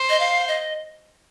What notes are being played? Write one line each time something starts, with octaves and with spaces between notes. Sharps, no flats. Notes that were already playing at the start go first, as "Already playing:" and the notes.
Already playing: C5
D#5
F5
D#5